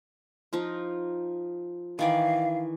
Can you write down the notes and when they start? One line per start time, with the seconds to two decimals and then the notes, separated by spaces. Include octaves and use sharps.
0.53 F3 D#4 F4
1.99 D#3 E3 D5 F5